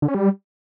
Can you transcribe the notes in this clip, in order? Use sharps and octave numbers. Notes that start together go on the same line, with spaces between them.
D3
C#4
G3